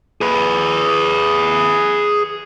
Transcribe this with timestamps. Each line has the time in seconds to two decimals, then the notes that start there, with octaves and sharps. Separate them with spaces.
0.21 G#4 B4